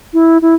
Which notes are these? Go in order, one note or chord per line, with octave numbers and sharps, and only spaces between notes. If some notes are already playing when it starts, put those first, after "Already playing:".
E4
E4